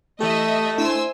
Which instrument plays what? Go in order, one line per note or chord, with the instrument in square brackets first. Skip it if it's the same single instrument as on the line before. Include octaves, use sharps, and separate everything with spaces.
[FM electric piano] E3 G4 [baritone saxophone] A3 [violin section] D#5 E5
[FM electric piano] D4 E4 [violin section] C5 G#5 E6